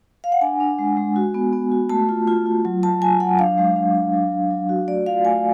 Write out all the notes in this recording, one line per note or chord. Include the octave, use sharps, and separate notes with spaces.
F5
F#5
D4 G#5
D4
G#3
G#3
F#4
B3
B3
F#4
A3 A5
F4
F4
F4
F#3
F#3 A5
F#3 G#5
F#3 F#5
D4 F5
G#3
D4
D4
F#3
F#3
F#3
F#4
A3 D5
F4 F5
A3 G#5